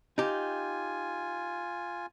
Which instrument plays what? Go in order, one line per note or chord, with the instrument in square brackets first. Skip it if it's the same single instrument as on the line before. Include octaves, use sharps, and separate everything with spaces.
[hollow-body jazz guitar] D#4 G4 [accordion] F4 G#5